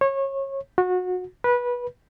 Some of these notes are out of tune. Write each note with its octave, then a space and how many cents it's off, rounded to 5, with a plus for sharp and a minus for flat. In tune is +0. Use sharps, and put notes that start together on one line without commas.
C#5 -25
F#4 -25
B4 -20